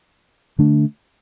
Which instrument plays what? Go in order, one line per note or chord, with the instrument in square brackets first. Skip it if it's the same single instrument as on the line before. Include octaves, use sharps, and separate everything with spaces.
[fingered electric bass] D3 A3 D4